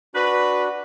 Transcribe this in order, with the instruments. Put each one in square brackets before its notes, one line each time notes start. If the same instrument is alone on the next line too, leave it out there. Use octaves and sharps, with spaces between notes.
[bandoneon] D4 F#4 [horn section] B4